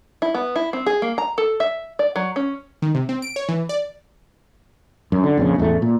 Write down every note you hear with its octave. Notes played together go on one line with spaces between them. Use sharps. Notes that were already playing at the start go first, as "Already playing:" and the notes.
E4
B3
E4
C4
G#4
A#3
A#5
A4
E5
D5
F#3
C#4
D#3
C3
C4
D7
C#5
E3
D5
F#2
D3
A#1 F2 C#3
A1 E2 G3 A3
A#2